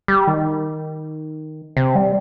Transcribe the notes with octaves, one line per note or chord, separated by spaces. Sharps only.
G3
D#3
C3
G3